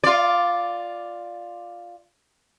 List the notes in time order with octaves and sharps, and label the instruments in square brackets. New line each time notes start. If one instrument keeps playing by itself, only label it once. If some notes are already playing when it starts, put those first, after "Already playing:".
[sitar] F4 D5